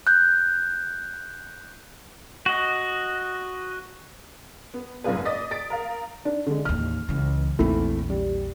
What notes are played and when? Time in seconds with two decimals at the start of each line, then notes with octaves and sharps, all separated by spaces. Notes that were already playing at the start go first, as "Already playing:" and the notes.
0.07 F#6 G6
2.46 F#4 D#5
4.74 B3
5.04 F#1 G#2 C3 F4 G#4 B4
5.25 D5 D#5 D#6 A6 B6
5.51 A6 B6 D7
5.70 A#4 F5
6.25 D4
6.47 D3 G#3
6.65 A1 D#2 F6
7.09 C#2 E3
7.59 A#1 E2 A3 C4 E4
8.10 G3